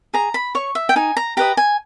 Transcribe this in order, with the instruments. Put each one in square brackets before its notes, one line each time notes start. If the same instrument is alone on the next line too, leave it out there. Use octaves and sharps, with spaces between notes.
[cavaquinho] G#4 A#5
B5
C#5 C#6
E5
G5
D#4 G#5
A#5
G4 B4 D#5 A#5
G#5